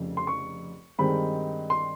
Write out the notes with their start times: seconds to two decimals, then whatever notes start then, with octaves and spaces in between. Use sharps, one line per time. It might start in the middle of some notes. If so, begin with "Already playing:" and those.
Already playing: F1 F2 C#3
0.17 C6
0.27 C#6
0.99 G2 D#3 G#3 C4 B5
1.70 C6